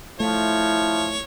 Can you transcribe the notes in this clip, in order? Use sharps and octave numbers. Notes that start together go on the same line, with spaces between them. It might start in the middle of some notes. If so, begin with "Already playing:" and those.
F3 A3 E4 C#5